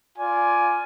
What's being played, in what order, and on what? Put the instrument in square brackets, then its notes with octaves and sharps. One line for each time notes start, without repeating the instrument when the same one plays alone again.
[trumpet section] F4 D5 G#5